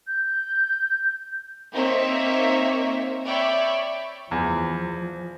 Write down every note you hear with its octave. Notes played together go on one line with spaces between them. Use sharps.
G6
A#3 C4 D#4 C#5 E5
C#5 D5 E5 G5 B5
E2 F3